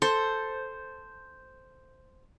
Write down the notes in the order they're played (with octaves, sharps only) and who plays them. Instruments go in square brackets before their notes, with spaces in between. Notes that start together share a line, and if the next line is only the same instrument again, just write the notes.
[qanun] A4 [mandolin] C5